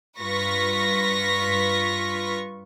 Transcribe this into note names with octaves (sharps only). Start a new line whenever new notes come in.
G2 F4 B4 C#6 A#6 B6